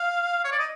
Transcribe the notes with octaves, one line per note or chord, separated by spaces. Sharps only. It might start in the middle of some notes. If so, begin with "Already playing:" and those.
Already playing: F5
C#5
D5
D#5